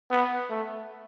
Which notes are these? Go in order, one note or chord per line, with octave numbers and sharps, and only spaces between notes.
B3
A3